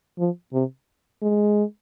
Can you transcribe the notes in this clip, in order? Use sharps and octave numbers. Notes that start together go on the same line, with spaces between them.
F3
C3
G#3